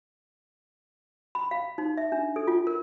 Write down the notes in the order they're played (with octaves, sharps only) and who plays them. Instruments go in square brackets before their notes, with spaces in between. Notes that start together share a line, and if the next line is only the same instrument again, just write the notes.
[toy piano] B5
F5
D#4
E5
D4
A4
F4
A#4